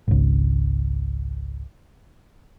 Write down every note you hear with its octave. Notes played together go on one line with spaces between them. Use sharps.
G#1 C#2